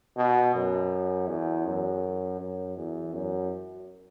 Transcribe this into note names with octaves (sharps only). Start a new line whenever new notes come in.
B2
F#2
E2
F#2
F#2
E2
F#2